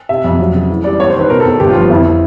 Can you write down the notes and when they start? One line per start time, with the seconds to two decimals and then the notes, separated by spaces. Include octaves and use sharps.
0.09 C3 E5
0.24 F2
0.39 F#3
0.54 C#3
0.69 E3
0.84 G3 D5
1.00 B3 C#5
1.10 C5
1.15 D#3
1.20 B4
1.30 B2 A#4
1.40 A4
1.45 E2
1.60 G1 G4
1.70 F4
1.75 F3
1.90 F2 E4